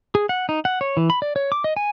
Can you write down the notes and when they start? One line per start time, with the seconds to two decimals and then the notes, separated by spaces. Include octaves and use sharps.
0.15 G#4
0.29 F#5
0.49 D#4
0.65 F#5
0.81 C#5
0.97 E3
1.10 B5
1.22 D5
1.36 C#5
1.52 D6
1.64 D#5
1.77 G#5